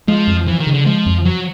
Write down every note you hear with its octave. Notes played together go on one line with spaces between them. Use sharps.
F3 G#3
F2
E3 F3
D#3
C#3
D3
F3 G#3
F2
F3 F#3